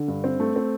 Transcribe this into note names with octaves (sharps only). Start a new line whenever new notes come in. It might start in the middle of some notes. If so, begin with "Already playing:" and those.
Already playing: D3
G2
C4
A3
C4